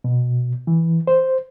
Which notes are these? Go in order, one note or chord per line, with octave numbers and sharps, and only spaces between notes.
B2
E3
C5